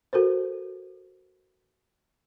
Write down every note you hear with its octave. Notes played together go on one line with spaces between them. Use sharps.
F#4 A4 A#4 C5